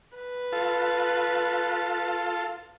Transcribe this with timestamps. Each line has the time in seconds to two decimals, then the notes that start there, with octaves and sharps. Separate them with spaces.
0.18 B4
0.52 F4 A4